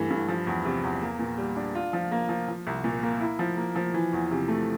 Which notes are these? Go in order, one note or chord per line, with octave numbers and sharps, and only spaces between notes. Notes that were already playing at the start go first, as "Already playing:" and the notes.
Already playing: G2 E3 A3
G2
F3
E2
C3
E2
A#3
A#2
G3
D4
F4
F3
A#3
F3
F3
C2
A#2
A#3
E4
F3
A#3
F3
E3
E2
C3
A3